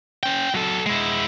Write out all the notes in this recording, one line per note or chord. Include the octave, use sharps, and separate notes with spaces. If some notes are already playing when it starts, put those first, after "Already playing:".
C#4 G5
F#3 A4
G#3 E4